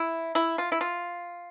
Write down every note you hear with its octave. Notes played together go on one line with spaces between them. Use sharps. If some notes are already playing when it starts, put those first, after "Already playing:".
Already playing: E4
E4
F4
E4
F4